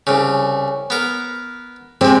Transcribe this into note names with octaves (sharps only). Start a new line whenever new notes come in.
C2 C#3
B3 A#4
C3 G#3 C4